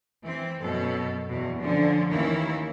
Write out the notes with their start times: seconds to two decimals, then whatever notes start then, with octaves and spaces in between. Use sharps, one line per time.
0.23 E3 C4
0.59 F#2 B2 A4
1.28 E2 B2
1.60 D3 F3 C#4
2.11 D#2 D#3 E3 A#3 C#4 E4